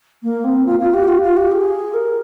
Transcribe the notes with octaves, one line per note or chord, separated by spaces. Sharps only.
A#3
C4
F4
F4
G4
F4
F4
G4
G#4
A#4